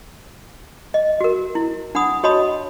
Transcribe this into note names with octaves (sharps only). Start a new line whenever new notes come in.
D#5
F#4 A#4
E4
D4 F#5 B5 D#6
F#4 C#5 D#5 A5 B5 D#6